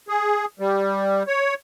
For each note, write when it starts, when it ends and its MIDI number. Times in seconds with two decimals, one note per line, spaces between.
0.08 0.45 68
0.59 1.23 55
1.27 1.54 73